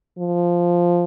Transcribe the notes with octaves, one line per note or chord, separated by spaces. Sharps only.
F3